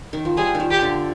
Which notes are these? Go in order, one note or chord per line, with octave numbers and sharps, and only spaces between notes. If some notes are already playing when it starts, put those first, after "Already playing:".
D#3
F3
G3 G#4
D#3
F3
G4
D3